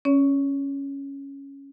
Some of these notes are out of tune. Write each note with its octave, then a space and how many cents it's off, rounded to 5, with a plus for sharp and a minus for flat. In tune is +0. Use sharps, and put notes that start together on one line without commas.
C#4 +0 C#5 +40